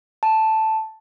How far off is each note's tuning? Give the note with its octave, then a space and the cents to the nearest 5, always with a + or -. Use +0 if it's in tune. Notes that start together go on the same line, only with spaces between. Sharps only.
A5 +0